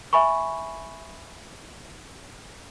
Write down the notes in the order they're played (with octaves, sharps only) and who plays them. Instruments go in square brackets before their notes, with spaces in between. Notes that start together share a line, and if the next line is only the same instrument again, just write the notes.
[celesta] E5 G#5 B5 C#6